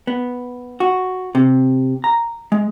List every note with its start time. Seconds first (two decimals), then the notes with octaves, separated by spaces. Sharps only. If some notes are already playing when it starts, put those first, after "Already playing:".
0.07 B3
0.80 F#4
1.35 C3
2.04 A#5
2.52 G#3